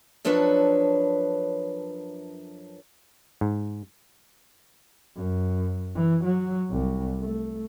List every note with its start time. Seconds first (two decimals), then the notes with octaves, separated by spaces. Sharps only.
0.25 F#2 F3 D4 A4 B4 C#5
3.41 G#2
5.16 F#2
5.95 E3
6.24 F#3
6.70 C2
7.20 A3